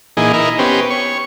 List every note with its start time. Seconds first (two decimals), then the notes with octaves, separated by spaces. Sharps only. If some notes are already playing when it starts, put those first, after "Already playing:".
0.17 A#2 E3 D#4 G#4
0.34 D#4 E4 A#4
0.59 B3 C#4 G4 C5
0.90 C#5